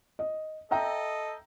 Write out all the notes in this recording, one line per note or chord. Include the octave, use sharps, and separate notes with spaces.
D#5
A4 D#5 E5 G5 A#5